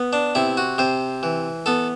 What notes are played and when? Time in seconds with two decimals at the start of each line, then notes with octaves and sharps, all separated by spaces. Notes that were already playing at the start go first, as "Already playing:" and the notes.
Already playing: B3
0.13 D4
0.35 C3 E4
0.57 F#4
0.78 C3 C5
1.23 E3
1.66 B3 A4